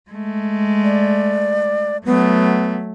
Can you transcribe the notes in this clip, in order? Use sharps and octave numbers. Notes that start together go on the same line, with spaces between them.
G#3 A3
D5
F#3 A3 B3